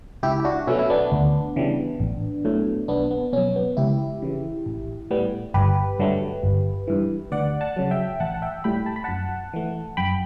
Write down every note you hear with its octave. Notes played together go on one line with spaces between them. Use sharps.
C#2 E4 G4
G4
D4 F#4
B2 F#3 A3 C#4 E4
E4
B3 D4
D2
C#3 E3 G3
A1
A2 F#3 A3
B1 B3 D4
B3
B2 F#3 C#4
B3
C#2 E4 G4
C#3 E3
A1
A2 G3 B3
G1 G4 B4
G2 D3 F#3 A3
G1
G2 E3
D2 D5 F#5
F#5 A5
C#3 F#3
E5 G5
A1 F#5 A5
F#5
E5 G5
A2 G3 G5 B5
A5
B5
F#2 F#5 A5
E3 A3
F#2 G5 B5